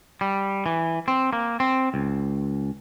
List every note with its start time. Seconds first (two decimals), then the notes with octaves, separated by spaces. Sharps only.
0.21 G3
0.66 E3
1.08 C4
1.33 A#3
1.60 C4
1.94 C#2